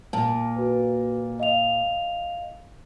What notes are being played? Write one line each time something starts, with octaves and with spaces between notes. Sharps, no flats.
A#2 A5
F#4 B4
D#5 F5 F7